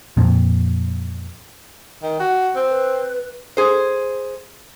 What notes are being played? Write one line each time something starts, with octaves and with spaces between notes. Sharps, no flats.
F2 A#2
D#3
F#4
C4
B4
G#4 C5